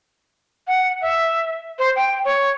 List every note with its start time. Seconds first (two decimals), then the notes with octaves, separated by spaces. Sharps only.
0.67 F#5
1.02 E5
1.79 C5
1.96 G5
2.25 C#5